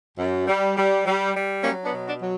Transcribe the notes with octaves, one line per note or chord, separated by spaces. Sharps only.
F#2
G3
G3
G3
G3
F#3 A#3 C#4
B3 D4
B2
D4 F#4
F#3